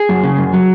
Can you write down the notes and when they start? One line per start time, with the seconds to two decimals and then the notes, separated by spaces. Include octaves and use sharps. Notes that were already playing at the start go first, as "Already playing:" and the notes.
Already playing: G#4
0.09 F#2
0.23 C#3
0.38 F#2
0.53 F#3